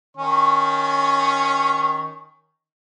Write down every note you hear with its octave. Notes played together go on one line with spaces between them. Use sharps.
D#3 C#4 C#5